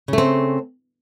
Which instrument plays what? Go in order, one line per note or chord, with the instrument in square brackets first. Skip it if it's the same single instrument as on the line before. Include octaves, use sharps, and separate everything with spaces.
[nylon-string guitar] C#3
A3
C4